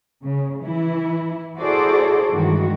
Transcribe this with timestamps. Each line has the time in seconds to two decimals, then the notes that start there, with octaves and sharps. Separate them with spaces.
0.24 C#3
0.63 E3 E4
1.57 E4 F#4 G#4 A4 C5 D5
2.32 G2 D#3 E3 G#3 F#4